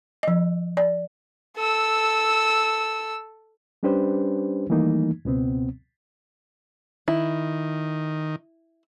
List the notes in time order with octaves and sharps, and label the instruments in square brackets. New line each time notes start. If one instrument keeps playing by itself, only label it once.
[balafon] F3 D#5
D5
[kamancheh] A4 E6
[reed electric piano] G3 C#4 D4 G4 B4 C5
D#3 E3 G3 A3 A#3 D#4
C#2 B2 B3 C4
[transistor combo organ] D#3 [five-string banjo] E4